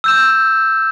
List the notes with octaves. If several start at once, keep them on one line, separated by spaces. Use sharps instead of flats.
E6 G6 E7